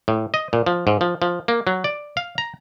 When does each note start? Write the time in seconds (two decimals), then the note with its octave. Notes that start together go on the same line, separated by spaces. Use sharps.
0.08 A2
0.34 D#5
0.53 A#2
0.66 F3
0.87 G#2
1.01 F3
1.22 F3
1.48 A#3
1.67 F#3
1.84 D5
2.17 F5
2.38 A#5